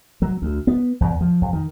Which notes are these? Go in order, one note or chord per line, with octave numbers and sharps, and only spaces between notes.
F#3
D2
B3
E2
F3
F2
D#3